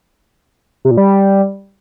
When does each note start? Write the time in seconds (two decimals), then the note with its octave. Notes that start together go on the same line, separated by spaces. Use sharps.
0.85 C3
0.91 A#2
0.97 G3